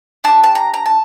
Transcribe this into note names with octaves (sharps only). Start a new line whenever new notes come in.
D4 G4 A5
A5
A#5
A#5
A5